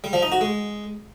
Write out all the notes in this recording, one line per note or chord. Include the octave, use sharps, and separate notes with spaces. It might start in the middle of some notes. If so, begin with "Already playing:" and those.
G3
F3
D#4
F#4
G#3